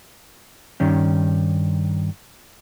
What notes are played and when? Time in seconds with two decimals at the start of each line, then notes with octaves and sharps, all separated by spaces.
0.80 G2 D#3 C#4